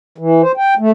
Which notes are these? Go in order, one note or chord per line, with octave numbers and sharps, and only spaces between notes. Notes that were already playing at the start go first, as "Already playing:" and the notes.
E3
C5
G5
A3